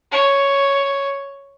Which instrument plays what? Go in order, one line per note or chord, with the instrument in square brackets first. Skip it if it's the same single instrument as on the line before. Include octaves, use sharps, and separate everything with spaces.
[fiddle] C#5